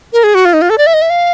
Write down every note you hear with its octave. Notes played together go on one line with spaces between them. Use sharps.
A#4
G#4
F#4
F4
D#4
F4
A4
D5
E5
D#5
E5
F5